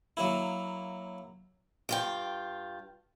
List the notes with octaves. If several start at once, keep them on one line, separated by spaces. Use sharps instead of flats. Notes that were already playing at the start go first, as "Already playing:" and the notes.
F#3 A#3 E4
G2 F4 G5